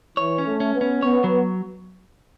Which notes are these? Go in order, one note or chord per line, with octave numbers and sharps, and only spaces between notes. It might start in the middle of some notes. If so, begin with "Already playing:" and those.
E3 C#5
C#4
A3
C#4
B3
C#4
B3 C#5
F#3